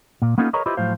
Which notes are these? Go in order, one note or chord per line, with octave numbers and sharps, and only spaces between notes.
A#2
A#3 B3 C#4 D#4 F4 A4
G#4 A#4 B4 C#5 D#5 A#5
E4 F4 G4 B4 C5 D#5
A2 F3 F#3 C5 F5